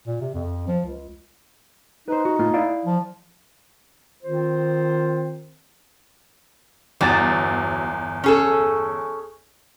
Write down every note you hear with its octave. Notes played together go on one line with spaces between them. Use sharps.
A#2
C3
F2
F3
C#2
D#4 B4 C5
F#4
A2 A#3 F4
E4 D5 F5
F3
D#3 C4 F4 C5
G1 E2 F#3 A6
C#4 G#4 A4